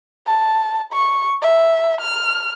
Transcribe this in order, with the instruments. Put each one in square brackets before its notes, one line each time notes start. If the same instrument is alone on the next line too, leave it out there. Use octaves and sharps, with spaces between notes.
[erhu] A5
C#6
E5
F6